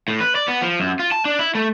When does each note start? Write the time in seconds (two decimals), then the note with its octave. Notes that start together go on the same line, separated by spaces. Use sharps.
0.08 A2
0.20 B4
0.35 D5
0.48 B3
0.62 F3
0.80 F#2
0.99 F4
1.12 A5
1.25 D4
1.39 E4
1.55 A3